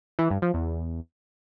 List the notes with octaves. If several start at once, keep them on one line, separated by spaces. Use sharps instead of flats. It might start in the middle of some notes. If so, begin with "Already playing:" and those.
E3
G2
F3
E2